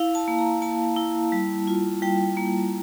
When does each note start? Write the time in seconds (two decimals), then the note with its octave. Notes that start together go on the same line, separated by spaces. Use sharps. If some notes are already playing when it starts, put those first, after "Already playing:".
Already playing: E4 F5
0.15 A5
0.28 A#3
0.39 A#5
0.62 A#3 A5
0.97 E4
1.32 G3
1.67 F4
2.02 G3 G5
2.37 A#3